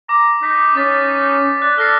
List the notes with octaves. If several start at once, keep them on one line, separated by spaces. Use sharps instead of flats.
A#5 D6
D#4 B6
C#4 D6 A6 B6
D5 F#6
A4 F6 A#6 C7